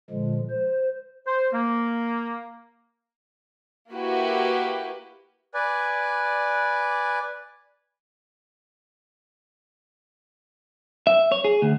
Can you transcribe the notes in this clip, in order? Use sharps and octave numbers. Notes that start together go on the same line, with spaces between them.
A#2 D3 F3 G#3
C5
C5
A#3
A#3 E4 F#4 G4 B4
B4 D5 G#5
E5
C#5
G#4
D2